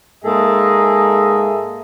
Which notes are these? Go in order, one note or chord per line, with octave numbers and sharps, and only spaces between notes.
G#2 A#3 G#4 A4 D#5 E5